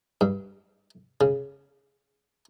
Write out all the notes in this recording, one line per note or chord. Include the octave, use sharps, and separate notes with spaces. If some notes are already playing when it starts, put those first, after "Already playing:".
G2
C#3